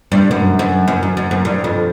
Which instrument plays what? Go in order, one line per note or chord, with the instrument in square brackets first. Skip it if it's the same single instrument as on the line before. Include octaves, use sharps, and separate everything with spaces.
[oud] G2
F#2
F#2
F#2
F#2
F#2
F#2
G2
F2